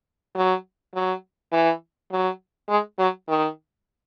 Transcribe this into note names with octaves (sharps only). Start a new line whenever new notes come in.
F#3
F#3
E3
F#3
G#3
F#3
D#3